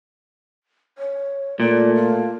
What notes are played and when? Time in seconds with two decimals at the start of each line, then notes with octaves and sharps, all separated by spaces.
0.98 C#5
1.60 A#2 A3 D5
1.95 F4